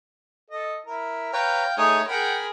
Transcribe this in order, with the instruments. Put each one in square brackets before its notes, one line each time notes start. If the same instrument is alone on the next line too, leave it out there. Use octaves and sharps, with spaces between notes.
[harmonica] A4 D#5
E4 A#4
[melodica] B4 C#5 A#5 [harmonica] F5 G5
[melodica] A3 D#4 [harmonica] G#4 D#6 [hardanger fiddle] C#5
[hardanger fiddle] G#4 A#4 [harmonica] F#5 G5 [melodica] B5